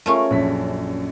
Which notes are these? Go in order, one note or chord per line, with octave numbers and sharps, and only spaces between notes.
A3 C#4 F4 G#4 A#4
A#1 F#2 B6